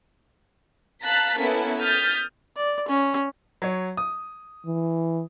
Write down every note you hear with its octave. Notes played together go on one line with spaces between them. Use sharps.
F5 A5 A#5 F#6 A6 B6
A#3 B3 C#4 E4 A4
D#6 F6 G6 A6 B6
D5
C#4
F#3 C#5
D#6
E3